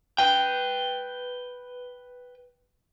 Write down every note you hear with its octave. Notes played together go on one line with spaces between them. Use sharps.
B4 G5